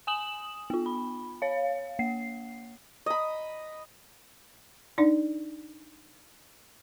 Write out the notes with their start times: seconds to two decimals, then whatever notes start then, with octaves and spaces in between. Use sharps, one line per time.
0.07 G#5 D#6 E7 F#7
0.70 B3 F4
0.86 B5
1.42 C#5 F5
1.99 A#3 C7
3.06 D#5 B5
4.98 D4 D#4 D5